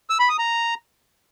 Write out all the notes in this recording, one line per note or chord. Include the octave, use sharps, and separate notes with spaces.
E6
B5
D#6
A#5